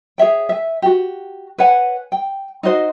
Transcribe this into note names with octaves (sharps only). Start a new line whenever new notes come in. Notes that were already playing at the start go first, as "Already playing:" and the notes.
G#4 C#5 E5 G5
E5 G#5
F#4 G4
B4 C#5 F#5 G#5
G5
D#4 F#4 C5 D#5